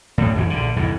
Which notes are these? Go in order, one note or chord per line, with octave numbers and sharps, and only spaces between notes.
D2 A2
F2 E3 F#3 G#3
A#1 D3
C2 F2 G#2 E3